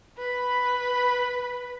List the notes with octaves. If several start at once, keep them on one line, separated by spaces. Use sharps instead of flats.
B4 B5